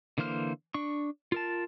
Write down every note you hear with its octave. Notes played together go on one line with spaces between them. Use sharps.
D3 E3 A#3 C5 F6
D4 C#6
F4 A#4 A5